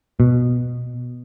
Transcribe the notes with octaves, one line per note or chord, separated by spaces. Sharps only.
B2